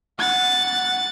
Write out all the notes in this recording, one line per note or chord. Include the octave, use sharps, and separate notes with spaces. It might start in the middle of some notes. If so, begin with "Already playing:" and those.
F#5 A6